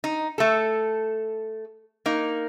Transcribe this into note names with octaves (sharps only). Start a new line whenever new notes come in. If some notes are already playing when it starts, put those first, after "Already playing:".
D#4
A3 A4
A#3 D#4